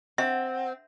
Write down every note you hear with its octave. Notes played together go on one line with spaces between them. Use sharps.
C4 E5 F#5